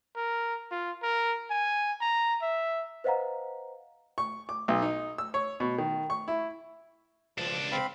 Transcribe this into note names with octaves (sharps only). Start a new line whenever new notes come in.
A#4
F4
A#4
G#5
A#5
E5
B4 C5 D#5 F5 F#5 A#5
C#6
D6
B1
D#4
E6
C#5
B2
D#3
C#6
E4
C#2 F3 D4
C4 F5 B5